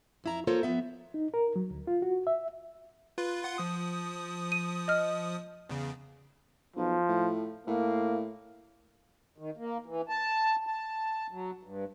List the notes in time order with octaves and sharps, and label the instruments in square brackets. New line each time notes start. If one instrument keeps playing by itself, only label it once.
[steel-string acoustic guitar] F2 E4 A#5
A#3 F4 A4 A#4 C5 C#5
F3 B3 E5
[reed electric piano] D#4
A#4
F#3
D2
F4
F#4
E5
[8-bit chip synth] F4 B4
F4 F#5 C6
F3 D#6
[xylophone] D#7
D#5 F6
[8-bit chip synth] E2 C#3
[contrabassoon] B1 [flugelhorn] F3
[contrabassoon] A2
[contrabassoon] A2 [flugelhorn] A#3
[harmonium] D#3
A#3
E3
A5
A5
F#3
G2